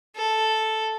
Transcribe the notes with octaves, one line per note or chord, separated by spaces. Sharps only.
A4